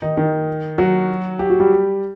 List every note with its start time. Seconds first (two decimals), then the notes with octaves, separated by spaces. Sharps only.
0.02 D#3 D#4
0.17 D#3 D#4
0.78 F#3 F#4
1.39 G4
1.50 F#4
1.60 G3 G4